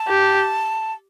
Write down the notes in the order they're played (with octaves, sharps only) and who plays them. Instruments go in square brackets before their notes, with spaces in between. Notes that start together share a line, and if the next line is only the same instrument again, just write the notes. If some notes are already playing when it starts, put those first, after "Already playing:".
Already playing: [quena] A5
[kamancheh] G4